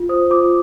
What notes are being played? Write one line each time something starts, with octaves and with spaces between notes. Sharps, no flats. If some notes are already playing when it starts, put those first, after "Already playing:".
Already playing: F4
C5 D#6
F4 D6